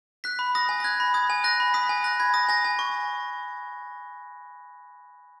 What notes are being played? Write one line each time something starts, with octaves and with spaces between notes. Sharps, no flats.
F#6 B6
B5
D#6 A#6
G#5
A#6
F#6 G#6
B5
D#6 G#6
G#5
F#6 A#6
B5
D#6 B6
G#5
F#6 A#6
B5 G#6
D#6 A#6
G#5 A#6
G#5
C#6